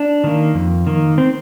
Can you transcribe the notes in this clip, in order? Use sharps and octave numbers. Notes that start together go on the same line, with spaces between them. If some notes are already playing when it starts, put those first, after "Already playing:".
Already playing: D4
D#3 A#3
F2
D#3 A#3
C4